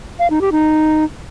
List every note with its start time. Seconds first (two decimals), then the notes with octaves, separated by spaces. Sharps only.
0.19 F5
0.30 D#4
0.41 G4
0.52 D#4